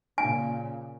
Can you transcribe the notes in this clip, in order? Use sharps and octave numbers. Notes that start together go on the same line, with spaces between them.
A#2 C#3 G#5